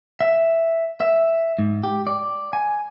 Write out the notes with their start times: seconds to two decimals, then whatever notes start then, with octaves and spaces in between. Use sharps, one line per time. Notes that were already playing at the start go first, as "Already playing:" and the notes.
0.21 E5
1.00 E5
1.59 G#2
1.83 G4
2.07 D5
2.53 G#5